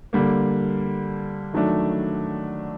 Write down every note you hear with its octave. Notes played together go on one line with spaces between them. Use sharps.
D3 G3 A#3
D#3 F#3 A3 D4